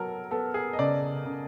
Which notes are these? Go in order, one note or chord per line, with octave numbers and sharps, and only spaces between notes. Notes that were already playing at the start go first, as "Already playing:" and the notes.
Already playing: F#3 B3 A4 A#4
B3 A4
G#4
D#5
C#3 D5
C#3